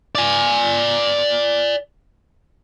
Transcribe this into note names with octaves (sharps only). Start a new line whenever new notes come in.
D5 G#5